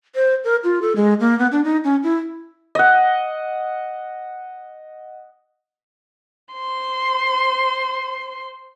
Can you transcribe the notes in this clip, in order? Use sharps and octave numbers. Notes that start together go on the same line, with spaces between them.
C5
A#4
F4
A4
G#3
A#3
B3
D4
D#4
C#4
E4
D#5 F#5
C5 C6